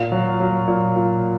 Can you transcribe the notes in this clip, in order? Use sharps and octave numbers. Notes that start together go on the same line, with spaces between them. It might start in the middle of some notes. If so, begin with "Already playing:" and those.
Already playing: A#2 F5
F#3
F#3
A#2
A#2